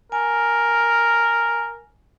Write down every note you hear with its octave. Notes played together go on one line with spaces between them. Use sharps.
A#4 G#5